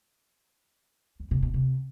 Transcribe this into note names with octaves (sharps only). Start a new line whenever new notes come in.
F2
C3
B2
C3